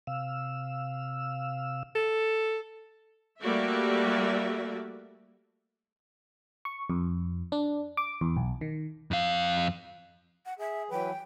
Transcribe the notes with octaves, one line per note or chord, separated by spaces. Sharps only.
C3 F5 E6
A4
G3 A3 A#3 F#4 D5 E5
C#6
F2
D4
D6
E2
B1
D#3
F2 F5
F#5
G#4 E5
E3 F#3 B4 G5